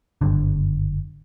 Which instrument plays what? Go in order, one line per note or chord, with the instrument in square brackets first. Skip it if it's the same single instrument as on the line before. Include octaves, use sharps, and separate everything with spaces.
[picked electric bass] F#1 G2 D3